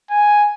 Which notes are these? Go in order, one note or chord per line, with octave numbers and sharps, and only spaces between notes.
G#5